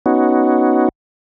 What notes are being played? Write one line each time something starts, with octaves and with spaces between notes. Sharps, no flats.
B3 C#4 D#4 F#4